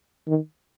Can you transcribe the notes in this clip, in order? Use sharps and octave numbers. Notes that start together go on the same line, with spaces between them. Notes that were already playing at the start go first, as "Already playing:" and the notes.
D#3